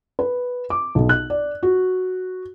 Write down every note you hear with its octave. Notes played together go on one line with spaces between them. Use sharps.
B4
D6
B1
F#6
D5
F#4